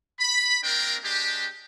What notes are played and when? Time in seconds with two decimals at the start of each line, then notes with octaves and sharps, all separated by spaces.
0.20 B5
0.63 A#3 C4 D4 A#4 G5
1.04 G#3 D4 G4